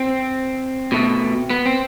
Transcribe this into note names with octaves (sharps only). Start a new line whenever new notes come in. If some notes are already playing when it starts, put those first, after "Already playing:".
Already playing: C4
B2 A3
B3
C4